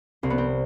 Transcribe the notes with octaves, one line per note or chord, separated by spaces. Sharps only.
C2 C4
B3
C4